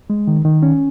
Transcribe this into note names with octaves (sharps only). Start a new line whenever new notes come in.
G#3
D#3
D#3
C#4